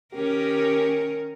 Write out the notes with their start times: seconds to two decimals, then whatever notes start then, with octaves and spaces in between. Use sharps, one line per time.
0.13 D#3 C#4 G4 A#4